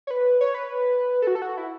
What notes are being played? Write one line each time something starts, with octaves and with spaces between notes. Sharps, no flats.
C#5
B4
C#5
B4
A4
F#4
A4
F#4
E4